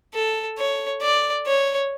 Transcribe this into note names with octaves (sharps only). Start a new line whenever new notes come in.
A4
C#5
D5
C#5